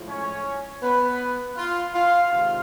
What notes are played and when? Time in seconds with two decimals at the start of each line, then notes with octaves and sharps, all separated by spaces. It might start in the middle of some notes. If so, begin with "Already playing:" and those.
Already playing: A2 F3 G#3
0.08 C#4 C#5
0.82 B3 B4
1.56 F4 F5
1.93 F4 F5
2.30 C3 D#3 G#3 F4 F5